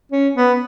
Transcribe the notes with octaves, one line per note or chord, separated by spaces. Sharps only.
C#4
B3